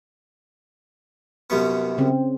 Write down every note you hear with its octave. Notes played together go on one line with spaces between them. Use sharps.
C2 F#2 B3
C#3 C4